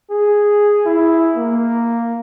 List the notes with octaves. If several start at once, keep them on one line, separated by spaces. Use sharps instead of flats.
G#4
E4
A#3